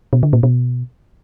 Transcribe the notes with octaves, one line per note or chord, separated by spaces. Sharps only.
B2
D3
A#2
B2